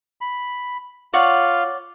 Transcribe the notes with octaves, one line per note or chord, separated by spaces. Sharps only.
B5
F4 C#5 D5 F5 F#5